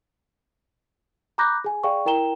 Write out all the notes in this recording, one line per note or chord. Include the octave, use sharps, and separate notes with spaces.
A#5 B5 D6 F#6 G6 A#6
G#4 G#5
G#4 D5 F5 G5 C#6
E4 A#4 G5 A#5 E7 G7